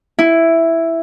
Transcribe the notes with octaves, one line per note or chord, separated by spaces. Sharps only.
E4